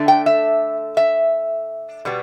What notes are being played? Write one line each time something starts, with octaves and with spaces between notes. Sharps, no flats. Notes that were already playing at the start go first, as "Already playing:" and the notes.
Already playing: D3 A3 D4
G5
E5
E5
B2 G3 B3